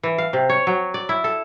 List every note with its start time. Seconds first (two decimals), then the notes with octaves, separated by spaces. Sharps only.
0.03 E3
0.18 F5
0.33 C3
0.50 C#5
0.67 F#3
0.94 D5
1.09 E4
1.24 A4